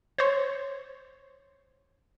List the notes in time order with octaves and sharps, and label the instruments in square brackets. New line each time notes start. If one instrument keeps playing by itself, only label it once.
[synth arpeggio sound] C5 C#5